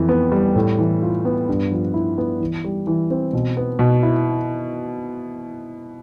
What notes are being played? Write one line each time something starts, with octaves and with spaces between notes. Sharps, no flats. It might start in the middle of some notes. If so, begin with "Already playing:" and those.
Already playing: F2 E3
B3
G3
A2
E3
F4
B3
G2
F3
E4
B3
E3
G3
E3
C4
B2
B3
B2
E4